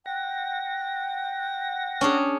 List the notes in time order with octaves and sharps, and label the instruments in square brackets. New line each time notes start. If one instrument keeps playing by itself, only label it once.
[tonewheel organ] F#5 A#6 [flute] G5
[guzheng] C#4 D4 G#4